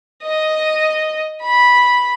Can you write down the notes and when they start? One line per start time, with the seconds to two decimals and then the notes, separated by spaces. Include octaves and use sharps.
0.23 D#5
1.41 B5